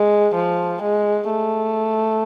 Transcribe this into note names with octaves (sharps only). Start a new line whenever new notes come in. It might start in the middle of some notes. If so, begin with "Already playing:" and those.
Already playing: G#3
F3
G#3
A3